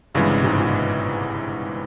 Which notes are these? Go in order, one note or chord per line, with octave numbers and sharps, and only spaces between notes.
G1 G2 C#3 E3 G#3
C3
G#2
A#2